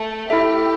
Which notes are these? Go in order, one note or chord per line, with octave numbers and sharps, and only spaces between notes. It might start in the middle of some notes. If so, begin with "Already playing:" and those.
Already playing: A3
E4 G4 A4 E5